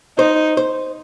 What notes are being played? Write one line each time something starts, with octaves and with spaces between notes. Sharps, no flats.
D#4 C5
C5